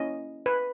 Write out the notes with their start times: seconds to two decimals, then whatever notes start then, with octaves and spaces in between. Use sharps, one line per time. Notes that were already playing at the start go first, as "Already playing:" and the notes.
Already playing: A#3 C#4 E4 D#5
0.46 B4